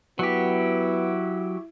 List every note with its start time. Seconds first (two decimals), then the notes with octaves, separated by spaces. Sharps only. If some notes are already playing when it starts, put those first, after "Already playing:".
0.19 F#3 B3 E4 G4